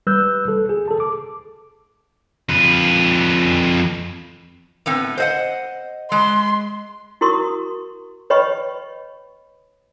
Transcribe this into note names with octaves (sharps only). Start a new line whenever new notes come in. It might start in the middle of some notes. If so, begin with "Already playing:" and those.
G3 B4 E6 F#6 G6
A4
G#4
A4 A5
D6
F2 B4
A2 B3 C4
C5 D#5 F#5
G#3 C6
E4 F#4 A#4 C6 C#6 D#6
B4 C#5 D#5 G5 B5 C#6